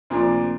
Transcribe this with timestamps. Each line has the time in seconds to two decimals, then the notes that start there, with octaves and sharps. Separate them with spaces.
0.10 D2 C3 F3 A#3 D4